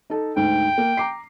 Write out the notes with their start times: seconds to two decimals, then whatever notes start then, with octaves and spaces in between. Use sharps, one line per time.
0.10 D#4 A4
0.36 D2 G#2 G5
0.78 A#3
0.97 A#5 D6 C7